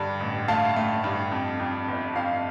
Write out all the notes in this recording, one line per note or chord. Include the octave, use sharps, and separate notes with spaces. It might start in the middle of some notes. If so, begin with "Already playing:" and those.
Already playing: G2 D3
A1
A3 F5 A5
A3
G2
F2
F2
G1
F2 F5